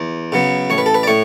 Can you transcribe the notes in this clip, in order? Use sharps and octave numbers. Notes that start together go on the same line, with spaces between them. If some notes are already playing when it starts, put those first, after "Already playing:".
Already playing: E2
C#3 F#3 B3
A1 C#5
B4
A4
B4
D5
A2 C#5